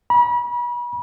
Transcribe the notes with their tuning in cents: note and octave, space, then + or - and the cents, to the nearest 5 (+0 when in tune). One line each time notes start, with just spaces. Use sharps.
B5 -35